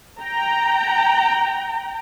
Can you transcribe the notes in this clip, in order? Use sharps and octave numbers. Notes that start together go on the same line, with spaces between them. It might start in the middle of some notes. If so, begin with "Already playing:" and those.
G5 A#5